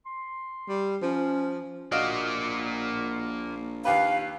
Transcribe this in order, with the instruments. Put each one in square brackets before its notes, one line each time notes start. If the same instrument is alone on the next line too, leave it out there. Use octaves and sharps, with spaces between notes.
[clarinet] C6
[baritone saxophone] G3
[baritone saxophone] F3 [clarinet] C#4
[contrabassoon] A#1 [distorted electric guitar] A#3 D5 [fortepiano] F#4 D#5 F5
[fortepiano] D#2 G4 B4 [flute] F5